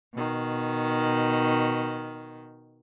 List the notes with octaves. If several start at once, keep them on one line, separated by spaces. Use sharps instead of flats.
B2 D#3